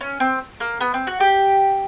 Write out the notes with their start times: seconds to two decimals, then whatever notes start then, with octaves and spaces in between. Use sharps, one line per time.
0.01 C#4
0.20 C4
0.60 A#3
0.81 B3
0.94 C4
1.07 F#4
1.20 G4